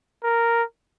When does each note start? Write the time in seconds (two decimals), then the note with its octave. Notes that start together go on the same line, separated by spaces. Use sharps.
0.24 A#4